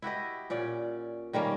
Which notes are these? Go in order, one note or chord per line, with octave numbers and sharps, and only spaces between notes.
E4 F#4 G4 D#5
A#2 C#4 D5
D#3 G3 A#3 C#4